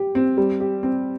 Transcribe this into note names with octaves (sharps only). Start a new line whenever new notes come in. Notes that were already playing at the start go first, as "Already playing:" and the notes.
Already playing: G4
C4
G3
G4
C4